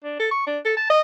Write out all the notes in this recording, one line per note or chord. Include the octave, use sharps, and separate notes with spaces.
D4
A4
C#6
D4
A4
A5
D#5